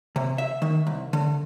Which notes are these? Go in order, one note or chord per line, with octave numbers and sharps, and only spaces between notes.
C3
E5
D#3
C2
D3